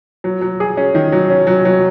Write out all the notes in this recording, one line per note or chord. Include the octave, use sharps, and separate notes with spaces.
F#3
F#3
G#4
C#4
D#3
F#3
C#4
F#3
F#3